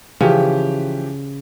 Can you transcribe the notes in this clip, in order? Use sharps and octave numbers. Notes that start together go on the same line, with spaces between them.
C#3 E3 F3 G4